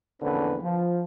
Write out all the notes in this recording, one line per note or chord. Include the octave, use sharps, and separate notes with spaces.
A#1 E2 D3 C4 C#4 B4
F3